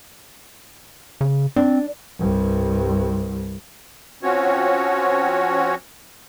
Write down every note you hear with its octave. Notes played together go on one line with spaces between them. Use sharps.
C#3
C4 D4
C2 G2
F3 C4 C#4 F#4 C#5